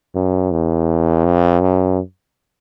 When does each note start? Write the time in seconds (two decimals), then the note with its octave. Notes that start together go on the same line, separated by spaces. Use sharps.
0.15 F#2
0.51 E2
1.25 F2
1.61 F#2